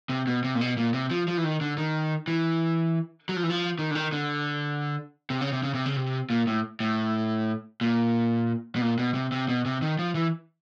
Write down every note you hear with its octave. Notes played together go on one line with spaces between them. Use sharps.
C3
B2
C3
A#2
B2
A#2
C3
F3
F3
E3
D#3
D3
D#3
E3
F#3
F3
E3
F3
D#3
D3
D#3
D3
C3
C#3
C3
C#3
C3
C#3
C3
A#2
A2
A2
A#2
B2
A#2
B2
C3
C3
B2
C3
D#3
F3
E3